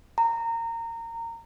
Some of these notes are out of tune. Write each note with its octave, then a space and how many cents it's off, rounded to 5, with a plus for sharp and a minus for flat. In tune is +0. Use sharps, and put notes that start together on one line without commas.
A#5 -20